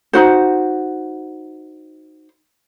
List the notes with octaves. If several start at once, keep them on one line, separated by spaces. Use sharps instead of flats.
D#4 F#4 C5